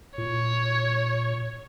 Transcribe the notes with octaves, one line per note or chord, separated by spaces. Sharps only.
A#2 C#5